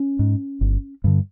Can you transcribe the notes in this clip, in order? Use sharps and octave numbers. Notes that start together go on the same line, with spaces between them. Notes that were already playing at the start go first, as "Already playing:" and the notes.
Already playing: C#4
G#2
G1
G2 D3